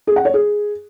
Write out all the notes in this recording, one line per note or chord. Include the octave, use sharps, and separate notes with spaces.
G#4
F#5
C#5
G#4